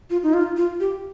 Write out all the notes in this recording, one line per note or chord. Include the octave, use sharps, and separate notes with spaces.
F4
D#4
F4
F4
G4